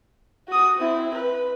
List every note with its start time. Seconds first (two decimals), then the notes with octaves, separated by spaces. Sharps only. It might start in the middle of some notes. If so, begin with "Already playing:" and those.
0.48 F#4 D#6
0.77 C4 E4
1.14 B4